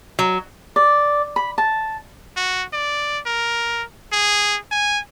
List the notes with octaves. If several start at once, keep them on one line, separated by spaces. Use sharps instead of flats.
F#3
D5
B5
A5
F#4
D5
A#4
G#4
G#5